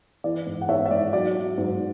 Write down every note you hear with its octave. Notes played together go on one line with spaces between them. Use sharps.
E3 D5
G#2
F#5
G#2 C#5 E5
E5
G#2 D5
F#3 D5
F#3
G#2